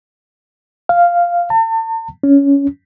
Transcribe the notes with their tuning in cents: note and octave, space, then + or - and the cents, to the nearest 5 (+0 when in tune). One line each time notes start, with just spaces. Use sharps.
F5 -5
A5 +40
C#4 +15